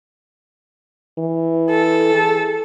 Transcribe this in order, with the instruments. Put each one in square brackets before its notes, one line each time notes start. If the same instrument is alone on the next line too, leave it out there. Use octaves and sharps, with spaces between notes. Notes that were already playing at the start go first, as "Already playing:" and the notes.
[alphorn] E3
[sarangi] A4
[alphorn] G#4